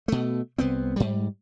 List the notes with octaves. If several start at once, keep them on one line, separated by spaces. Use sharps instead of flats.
B2 A3
C2 B3 C4
G#2 G3